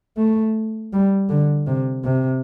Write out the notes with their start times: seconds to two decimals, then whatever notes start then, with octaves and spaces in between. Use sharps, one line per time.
0.17 A3
0.93 G3
1.29 D3
1.67 C3
2.04 C3